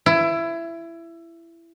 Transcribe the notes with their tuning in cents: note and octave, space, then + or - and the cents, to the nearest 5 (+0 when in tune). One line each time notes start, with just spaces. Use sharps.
E4 +20